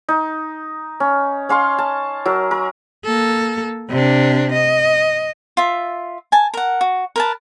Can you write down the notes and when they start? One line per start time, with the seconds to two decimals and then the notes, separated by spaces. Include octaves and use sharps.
0.08 D#4
1.00 C#4
1.49 C#4 F5 C6 C#6
1.78 A5
2.25 F#3 A#4 A#5
2.51 A#4
3.05 A#3 A4
3.90 C3 D4
4.53 D#5
5.57 F4 E5
6.32 G#5 A5
6.54 A#4 F#5
6.81 F#4
7.16 A#4 B4 A5